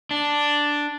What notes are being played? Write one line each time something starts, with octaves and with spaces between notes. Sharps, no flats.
D4